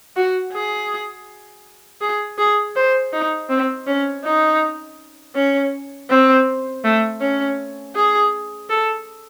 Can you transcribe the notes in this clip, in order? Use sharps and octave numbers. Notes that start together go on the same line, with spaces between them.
F#4
G#4
G#4
G#4
C5
D#4
C4
C#4
D#4
C#4
C4
A3
C#4
G#4
A4